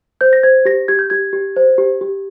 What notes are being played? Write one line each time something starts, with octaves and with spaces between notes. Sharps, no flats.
C5 G6
A#6
C5 G#6
G4 A#6
G4 G#6
G6
G4 G#6
G4
C5
G4
G4